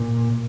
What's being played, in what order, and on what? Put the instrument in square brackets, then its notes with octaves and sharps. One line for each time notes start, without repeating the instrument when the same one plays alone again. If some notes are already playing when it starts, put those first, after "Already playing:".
Already playing: [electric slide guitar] A#2